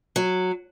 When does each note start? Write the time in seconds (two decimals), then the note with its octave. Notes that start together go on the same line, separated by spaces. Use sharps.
0.16 F#3